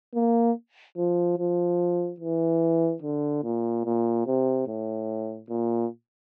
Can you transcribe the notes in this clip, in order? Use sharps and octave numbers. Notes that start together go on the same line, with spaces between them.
A#3
F3
F3
E3
D3
A#2
A#2
C3
A2
A#2